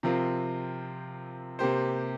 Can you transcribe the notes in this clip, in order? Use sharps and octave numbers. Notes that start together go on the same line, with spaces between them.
C3 F3 C4 F4 A#4
C3 A#3 G4 C5